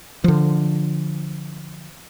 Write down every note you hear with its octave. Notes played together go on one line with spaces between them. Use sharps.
D3 F3